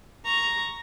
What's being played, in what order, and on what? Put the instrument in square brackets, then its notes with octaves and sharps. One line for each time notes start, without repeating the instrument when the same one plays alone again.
[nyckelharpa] A#5 C#6